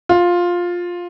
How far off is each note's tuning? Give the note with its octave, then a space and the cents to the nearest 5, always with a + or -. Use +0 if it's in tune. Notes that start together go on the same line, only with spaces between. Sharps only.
F4 +10